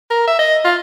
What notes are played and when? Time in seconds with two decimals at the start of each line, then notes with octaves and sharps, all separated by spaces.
0.11 A#4
0.28 E5
0.39 D#5
0.65 F4